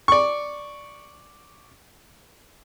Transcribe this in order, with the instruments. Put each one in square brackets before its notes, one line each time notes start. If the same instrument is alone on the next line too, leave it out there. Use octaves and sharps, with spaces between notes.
[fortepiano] D5 C#6